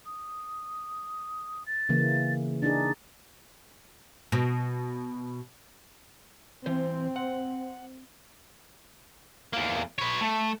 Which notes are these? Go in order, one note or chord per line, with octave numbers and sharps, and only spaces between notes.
D#6
A6
C#3 E3 A#3
D4 D#4 G#4 A6
B2
E3 C4 C5
F#5
E2 A#3
B4 C#5
A3